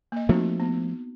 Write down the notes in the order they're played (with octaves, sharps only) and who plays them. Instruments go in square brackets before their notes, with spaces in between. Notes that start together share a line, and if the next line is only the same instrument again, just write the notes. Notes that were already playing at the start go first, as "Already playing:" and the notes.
[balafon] A#3 D#5
[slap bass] F3 A3 A#3 [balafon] C4 D#4 F#4
[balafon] B3